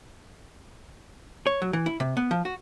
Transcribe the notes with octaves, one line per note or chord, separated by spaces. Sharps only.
C#5
F#3
E3
E4
C3
B3
F3
F#4